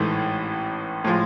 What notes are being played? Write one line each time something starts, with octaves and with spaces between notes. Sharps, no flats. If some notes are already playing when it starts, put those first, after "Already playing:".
Already playing: A1 G#2 E3 A3
A2 F3 G#3